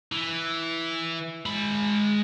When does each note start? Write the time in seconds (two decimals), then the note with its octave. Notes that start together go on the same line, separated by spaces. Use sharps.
0.12 E3
1.46 G#3 B5